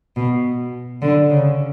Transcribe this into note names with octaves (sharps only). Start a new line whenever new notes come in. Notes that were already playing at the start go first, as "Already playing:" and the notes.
B2
D3
C#3